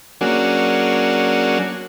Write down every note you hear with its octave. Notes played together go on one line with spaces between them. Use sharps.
F#3 A#3 C#4 D4 F#4 G#4